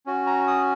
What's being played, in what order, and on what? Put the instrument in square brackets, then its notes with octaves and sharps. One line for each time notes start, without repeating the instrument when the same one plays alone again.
[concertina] C#4 F#4
A#5
D#6